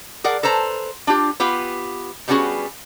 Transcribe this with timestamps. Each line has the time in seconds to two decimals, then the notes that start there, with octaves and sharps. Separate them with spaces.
0.24 G#4 A#4 D5 F#5
0.43 A4 B4 C5 A#5
1.07 D4 F4 G4
1.40 B3 F4 G4 B4
2.28 B2 G3 B3 C#4 F#4 G#4